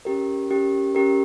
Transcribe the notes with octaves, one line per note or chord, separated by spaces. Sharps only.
C#4 G4 A#4
C#4 G4 A#4
C#4 G4 A#4